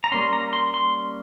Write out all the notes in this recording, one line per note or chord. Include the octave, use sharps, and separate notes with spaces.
A#5
G3 A#3 C#4 C6
A#5
C6
C6